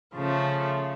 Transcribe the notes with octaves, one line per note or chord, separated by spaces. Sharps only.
C#3 F3 A3